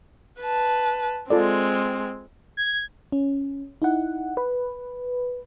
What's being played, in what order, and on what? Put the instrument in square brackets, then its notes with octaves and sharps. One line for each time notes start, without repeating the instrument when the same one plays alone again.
[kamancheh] B4 A5
[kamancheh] G#3 C4 [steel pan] F4 A4 D5
[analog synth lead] G#6
[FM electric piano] C#4
D#4 E4 F#5
B4